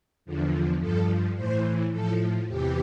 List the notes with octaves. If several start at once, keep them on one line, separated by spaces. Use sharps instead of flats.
E2 D3 F3
G2 F3 A4
A2 E3 C5
A2 F3 A4
E2 C3 E3 G4